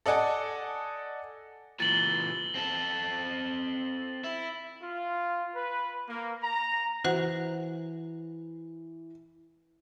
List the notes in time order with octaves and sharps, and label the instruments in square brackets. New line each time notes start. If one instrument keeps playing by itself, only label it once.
[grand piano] A4 D5 D#5 F#5 G#5 A5
[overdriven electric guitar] A#2 E3 [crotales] A6 F#7 G7
[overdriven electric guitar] C4 A4
E4
[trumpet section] F4
B4
A#3
A#5
[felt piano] E3 [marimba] F#4 C5 F#5